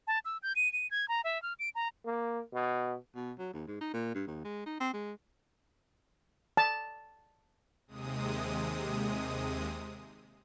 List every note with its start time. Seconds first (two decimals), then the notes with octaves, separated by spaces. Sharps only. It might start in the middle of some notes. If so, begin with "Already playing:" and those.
0.07 A5
0.25 E6
0.43 G6
0.56 D#7
0.73 D#7
0.91 G#6
1.08 A#5
1.24 E5
1.42 F6
1.59 D7
1.75 A#5
2.05 A#3
2.53 B2
3.15 B2
3.39 F#3
3.54 D#2
3.68 G#2
3.81 D#4
3.94 A#2
4.15 G2
4.27 D#2
4.45 G#3
4.66 D#4
4.80 C4
4.94 G#3
6.57 A5
7.87 D#2 C3 G#3 D#6